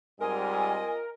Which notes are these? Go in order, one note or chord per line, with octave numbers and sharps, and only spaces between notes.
G#2 G3 C4 F4 A#4 D#5 G#5